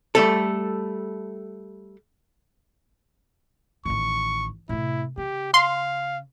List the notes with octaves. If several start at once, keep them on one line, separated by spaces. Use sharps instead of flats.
G3 A3 A4
A1 D#3 C#6
A2 C3 E4
C#3 G4
F5 C6